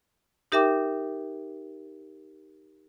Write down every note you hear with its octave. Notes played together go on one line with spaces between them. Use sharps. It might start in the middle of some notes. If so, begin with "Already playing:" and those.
D#4 G4 A#4 E5 G5 D6